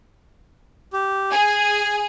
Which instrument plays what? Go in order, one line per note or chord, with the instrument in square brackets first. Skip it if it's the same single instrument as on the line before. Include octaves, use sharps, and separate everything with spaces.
[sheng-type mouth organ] G4
[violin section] G#4 [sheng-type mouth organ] G#5